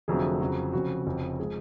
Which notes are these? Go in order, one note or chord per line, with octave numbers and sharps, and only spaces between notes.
F1 F2 D3 F#3 A3 G#4
F2 C#3 F#3
F1 F2 C#3 F#4
F1 F2 C#3
F3 G#3 G#4